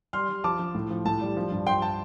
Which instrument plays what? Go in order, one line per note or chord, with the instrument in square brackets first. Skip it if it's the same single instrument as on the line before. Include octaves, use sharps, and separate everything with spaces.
[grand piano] G3 C6 F6
G3
F3 A5 D6
F3
A2
F3
A2 A5
G3
F3
G2
F3 G5 C6
A5